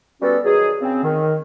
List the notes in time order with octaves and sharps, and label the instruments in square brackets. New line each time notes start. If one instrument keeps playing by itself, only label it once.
[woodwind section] G3 B3 C#4 F#4 A4
D#3 F#3 G#4
C#3 C4
D#3